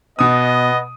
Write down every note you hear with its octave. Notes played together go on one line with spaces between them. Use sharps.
B2 B3 D#5 D#6